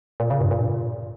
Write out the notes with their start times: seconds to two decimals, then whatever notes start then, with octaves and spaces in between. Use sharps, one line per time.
0.20 A#2
0.30 C#3
0.41 G2
0.51 A#2